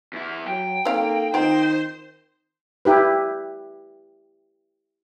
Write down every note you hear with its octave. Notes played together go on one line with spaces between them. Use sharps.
E2 E4
F#3 G5
A#3 C4 C#4 D#4 A4 F5
D#3 C4 D#4 F4 C5
E4 G4 B4